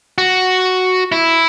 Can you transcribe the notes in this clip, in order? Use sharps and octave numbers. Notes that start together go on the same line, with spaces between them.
F#4
E4